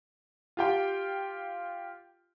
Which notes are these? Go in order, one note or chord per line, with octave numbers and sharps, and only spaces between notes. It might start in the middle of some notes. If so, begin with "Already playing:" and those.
F4 G4 G5